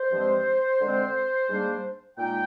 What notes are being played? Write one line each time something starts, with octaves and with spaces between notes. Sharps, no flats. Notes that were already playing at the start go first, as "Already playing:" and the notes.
Already playing: C5
G2 F3 G#3 C4
D3 G#3 C4
G#2 G3 A#3 D4
A#2 G#3 D#4 G5